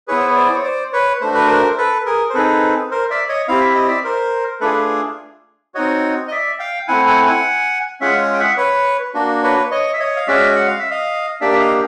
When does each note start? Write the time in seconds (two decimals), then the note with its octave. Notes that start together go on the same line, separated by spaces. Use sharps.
0.08 B3 E4 G#4 B4 C#5
0.19 C5
0.28 C#5
0.36 C5 D5
0.54 C#5
0.64 C5 D5
0.93 B4 C#5
1.21 A3 D4 F#4 C5
1.34 B4
1.46 A#4 C5
1.78 A4 B4
2.06 G#4 A#4
2.30 C5
2.34 C4 D#4 G#4 A4 B4
2.91 A#4 C5
3.10 D5 E5
3.29 C#5 D#5
3.48 C4 E4 G4 F5
3.61 E5
3.74 D#5
3.88 D5 E5
4.04 A#4 C5
4.61 A3 D4 F4 G#4 A4 B4
5.75 C4 D#4 F#4 C#5 D#5
6.28 D#5
6.31 D5 E5
6.59 F5 G5
6.88 A3 C4 E4 F#5 G#5
7.06 F#5 G#5
7.26 F#5 G#5
8.01 G#3 C#4 F4 G#4 E5 F#5
8.34 G5
8.39 E5 F#5
8.57 B4 C#5
9.14 A#3 D4 F#4
9.43 B4 C#5
9.71 C#5 D#5
9.93 E5
9.99 C#5 D#5
10.16 F5
10.27 G#3 C#4 F#4 D5 E5
10.56 F#5
10.67 F5
10.79 E5
10.91 D#5 F5
11.41 A#3 D4 G4 D5 E5
11.52 E5
11.60 D#5 F5